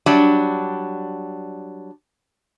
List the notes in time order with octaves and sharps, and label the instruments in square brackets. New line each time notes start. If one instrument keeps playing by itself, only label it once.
[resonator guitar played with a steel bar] F#3 G3 D4